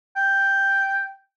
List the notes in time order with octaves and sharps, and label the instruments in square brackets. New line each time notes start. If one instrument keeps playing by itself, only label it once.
[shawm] G5